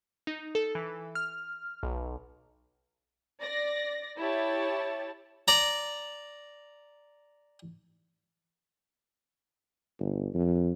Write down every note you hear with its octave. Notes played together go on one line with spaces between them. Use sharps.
D#4
A4
E3
F6
B1
D5 A#6
E4 G4 C#5 A5 A6
D5 A#5
G1
F2